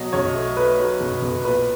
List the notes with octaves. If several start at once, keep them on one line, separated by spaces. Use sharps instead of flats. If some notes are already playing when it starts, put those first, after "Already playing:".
Already playing: B2 F#3 D#5
B1 C#5
A3
A3 B4
F#3
B1
B1
A#2 B4